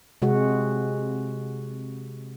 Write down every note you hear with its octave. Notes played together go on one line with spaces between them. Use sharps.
C3 G#3 F#4